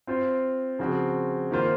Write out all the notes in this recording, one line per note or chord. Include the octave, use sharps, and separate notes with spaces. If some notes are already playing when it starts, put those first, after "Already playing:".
C4 F4 C5
C#3 F3 C4 F#4
D#3 A#3 F4 C5